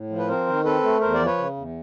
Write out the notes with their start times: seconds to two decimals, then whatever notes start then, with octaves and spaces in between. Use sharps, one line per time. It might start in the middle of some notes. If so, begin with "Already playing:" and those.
Already playing: A2
0.10 F3
0.18 B4
0.28 C4 A#4 C5
0.47 D#3
0.64 C4 A4 B4
0.83 A3
1.00 E2 A#4 C5
1.14 D5
1.19 F3
1.26 B4 C#5
1.38 C#3
1.56 E2